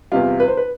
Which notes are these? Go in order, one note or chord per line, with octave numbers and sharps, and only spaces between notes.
E2 C3 G3 F4
B4
C5
B4